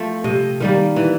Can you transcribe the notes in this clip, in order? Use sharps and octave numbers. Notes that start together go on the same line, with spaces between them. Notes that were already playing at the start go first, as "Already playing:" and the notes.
Already playing: F3 A3 C4
C3 D#5
D#3 G3 A#3
E3